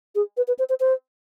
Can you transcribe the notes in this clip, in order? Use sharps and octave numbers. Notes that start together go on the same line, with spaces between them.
G#4
B4
B4
C5
C5
C5